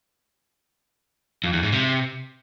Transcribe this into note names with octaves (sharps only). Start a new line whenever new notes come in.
F2
E2
G#2
C3